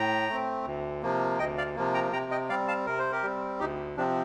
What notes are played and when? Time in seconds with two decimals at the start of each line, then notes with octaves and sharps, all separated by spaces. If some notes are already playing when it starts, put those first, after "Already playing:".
Already playing: A2 G5 A#5
0.29 A3 C4
0.66 D2
1.03 C3 F3 A#3
1.39 D2 D#5 G5
1.58 D5 F5
1.76 C3 F3 A#3
1.94 G5 A#5
2.13 C3 G5 A#5
2.31 D#5 G5
2.49 G3 C4 D5 F5
2.68 F5 A5
2.86 C3 A#4
2.99 C5
3.12 G4 A#4
3.23 G3 C4
3.60 D2 D#4 G4
3.97 C3 F3 C4 D4